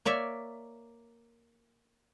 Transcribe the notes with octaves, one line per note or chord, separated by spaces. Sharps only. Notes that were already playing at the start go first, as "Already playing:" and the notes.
A#3 C#5 D5 E5